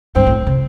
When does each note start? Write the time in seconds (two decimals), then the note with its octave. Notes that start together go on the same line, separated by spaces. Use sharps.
0.16 G2 C4
0.27 A2
0.47 C3